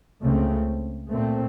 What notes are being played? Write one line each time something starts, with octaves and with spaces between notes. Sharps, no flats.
C#2 C#3 A3 C4
A#2 A3 C4